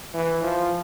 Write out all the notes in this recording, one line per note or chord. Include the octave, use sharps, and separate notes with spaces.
E3
F3